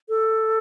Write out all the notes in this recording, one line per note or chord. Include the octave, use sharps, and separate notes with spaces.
A4